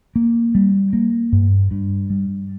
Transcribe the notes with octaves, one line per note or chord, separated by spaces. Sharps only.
A#3
G3
A#3
G2
G2
G3